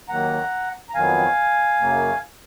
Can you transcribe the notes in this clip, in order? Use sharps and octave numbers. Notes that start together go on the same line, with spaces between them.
D#2 D#3 F#3 A#3 F#5 A#5
A#5
F2 D#3 F#3 B3 F5 G#5
F#2 C#3 F#3 A#3